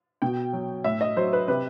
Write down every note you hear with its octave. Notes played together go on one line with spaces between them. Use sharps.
B2 G5
F#3
A2 E5
D#5
F#3 C5
B4
C3 B4